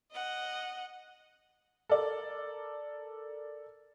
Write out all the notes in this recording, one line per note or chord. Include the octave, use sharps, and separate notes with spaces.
D#5 F#5
A4 A#4 D5